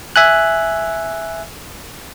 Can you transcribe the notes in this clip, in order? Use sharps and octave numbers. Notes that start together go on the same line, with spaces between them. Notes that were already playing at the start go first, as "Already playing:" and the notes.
E5 G#5 F#6